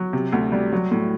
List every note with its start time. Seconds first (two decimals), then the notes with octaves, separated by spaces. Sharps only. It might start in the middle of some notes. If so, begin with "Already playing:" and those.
Already playing: F#3
0.13 C3
0.33 D2
0.52 G3
0.72 F#3
0.91 A2